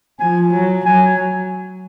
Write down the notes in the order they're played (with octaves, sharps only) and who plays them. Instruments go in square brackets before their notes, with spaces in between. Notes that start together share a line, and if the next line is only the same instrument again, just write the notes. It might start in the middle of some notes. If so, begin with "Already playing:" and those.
[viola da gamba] F3 [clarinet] G#5
[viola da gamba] F#3
[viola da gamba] F#3 [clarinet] G#5